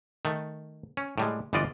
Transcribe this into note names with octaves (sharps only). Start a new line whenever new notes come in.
D#3 A3
C#4
A2 G3 G#3
G1 E3 B3 F4 D5 D#5